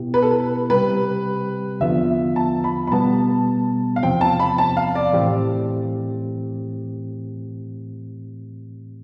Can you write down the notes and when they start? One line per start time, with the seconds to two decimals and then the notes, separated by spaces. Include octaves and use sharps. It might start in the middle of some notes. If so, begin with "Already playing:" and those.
Already playing: B2 B3 E4 G4
0.14 B4
0.22 A4
0.31 B4
0.70 C3 G3 C4 G4 B4
1.80 E2 D3 F3 B3 F4 E5
2.36 A5
2.64 B5
2.87 B5
2.92 B2 G3 B3 A5
3.96 F5
4.03 E2 C3 F3 C4 G5
4.21 A5
4.40 B5
4.58 A5
4.77 F5
4.95 D5
5.13 A2 E3 A3 C4 G4